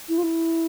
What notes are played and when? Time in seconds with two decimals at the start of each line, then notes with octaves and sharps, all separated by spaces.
0.09 E4
0.18 F4
0.23 E4